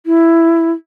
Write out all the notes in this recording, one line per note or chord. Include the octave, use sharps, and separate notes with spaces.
E4